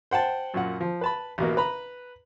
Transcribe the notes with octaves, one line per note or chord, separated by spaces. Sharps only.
C5 F#5 G5 A5
F#2 A#2 F#5
F3
B4 A5 B5
A1 B2 A#3
B4 A#5 B5